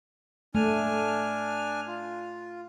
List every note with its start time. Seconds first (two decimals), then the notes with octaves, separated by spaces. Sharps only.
0.55 A3 D4 G#5 F6
1.87 F4